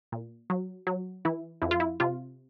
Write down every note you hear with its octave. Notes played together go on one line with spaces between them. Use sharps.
A#2
F#3
F#3
E3 E4
F2 E4
F4
E4
C3 F4